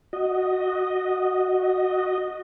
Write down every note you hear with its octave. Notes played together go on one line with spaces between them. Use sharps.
F#4 D#5